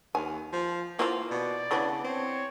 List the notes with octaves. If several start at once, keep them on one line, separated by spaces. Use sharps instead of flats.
D#2 G#5
F3
E3 A#3 F4 C5
B2 D5
C#3 E3 B3 D4
C4 C#5